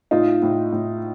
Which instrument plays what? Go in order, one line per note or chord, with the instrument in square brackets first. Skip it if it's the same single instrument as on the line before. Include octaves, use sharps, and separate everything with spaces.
[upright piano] A2 D#4 F4
A2
A2